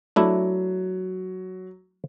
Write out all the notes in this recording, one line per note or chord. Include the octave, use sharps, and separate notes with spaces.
F#3 A3 D4 E4